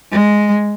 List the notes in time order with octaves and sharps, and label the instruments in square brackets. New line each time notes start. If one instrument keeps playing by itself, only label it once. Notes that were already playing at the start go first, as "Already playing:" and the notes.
[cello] G#3